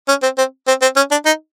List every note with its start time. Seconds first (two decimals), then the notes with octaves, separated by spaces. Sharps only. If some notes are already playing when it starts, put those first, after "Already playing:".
0.08 C#4
0.23 C4
0.38 C4
0.68 C4
0.82 C4
0.96 C#4
1.11 D4
1.25 D#4